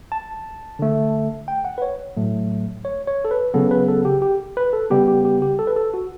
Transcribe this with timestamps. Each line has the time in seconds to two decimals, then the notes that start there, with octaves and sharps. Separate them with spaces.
0.12 A5
0.79 D3 A3
1.48 G5
1.65 F#5
1.78 B4
1.82 C#5
2.17 A2 F#3 A3
2.85 C#5
3.07 C#5
3.25 A4
3.31 B4
3.54 C#3 F#3 B3 A4
3.71 B4
3.88 A4
4.05 G4
4.22 G4
4.57 B4
4.73 A4
4.91 C#3 G3 B3 G4
5.08 G4
5.25 G4
5.42 G4
5.59 A4
5.67 B4
5.76 A4
5.94 F#4